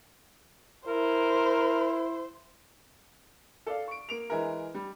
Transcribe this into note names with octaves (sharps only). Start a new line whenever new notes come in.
E4 A#4 C5
A4 D5 F5
C#6 D7
A#3 D7 F7
E3 G#3 E4 A#4
G3